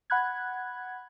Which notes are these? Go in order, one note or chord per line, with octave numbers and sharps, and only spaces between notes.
F#5 B5 F#6 G#6